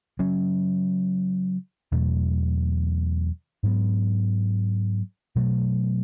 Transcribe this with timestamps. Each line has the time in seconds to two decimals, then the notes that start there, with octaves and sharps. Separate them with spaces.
0.19 C#3 F#3 C#4
1.92 E2 B2 F#3 A3
3.63 G#2 F#3 B3
5.35 B2 F#3 A3